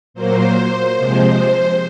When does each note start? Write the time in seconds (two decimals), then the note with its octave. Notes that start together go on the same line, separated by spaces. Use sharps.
0.14 A#2 F#3 A#3 C5
0.96 C3 F3 G#3 C5